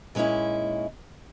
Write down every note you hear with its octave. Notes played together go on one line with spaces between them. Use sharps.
A#2 G#3 C#4 D#4 E4